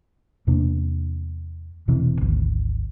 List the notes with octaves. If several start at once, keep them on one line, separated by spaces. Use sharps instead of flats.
E2 C3 A#3 D4
E1 C3 E3
G#1 D2